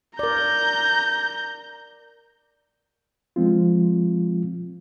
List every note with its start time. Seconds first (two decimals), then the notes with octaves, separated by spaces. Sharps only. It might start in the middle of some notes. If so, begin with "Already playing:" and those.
0.19 A#4 D5 A#5 G6
3.36 F3 G#3 C4 F4